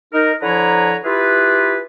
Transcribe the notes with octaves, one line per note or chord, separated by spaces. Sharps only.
D#4 A#4
D3 F3 E4 B4 C#5 A#5
E4 F4 G4 G#4 B4